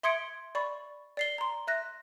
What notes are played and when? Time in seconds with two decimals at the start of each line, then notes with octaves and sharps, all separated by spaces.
0.03 E5 C6 D#6 G#6 C#7 D7
0.55 D5 B5 C#6
1.17 D5 C7 G7
1.38 A#5 C6
1.67 E5 F#6 A#6